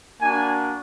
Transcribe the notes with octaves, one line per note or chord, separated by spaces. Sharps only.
A#3 D4 F#4 G#5